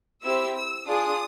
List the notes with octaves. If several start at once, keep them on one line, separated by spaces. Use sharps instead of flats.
C4 E4 G4 E6
E6
D4 F4 G#4 D#6